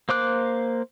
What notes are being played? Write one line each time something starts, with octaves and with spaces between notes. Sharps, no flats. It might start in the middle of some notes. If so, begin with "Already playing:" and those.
A#3 C5 D6 F#6